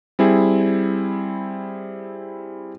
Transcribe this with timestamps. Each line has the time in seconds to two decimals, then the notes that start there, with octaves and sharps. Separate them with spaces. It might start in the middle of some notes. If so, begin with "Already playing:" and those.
0.19 G3 C4 E4 G#4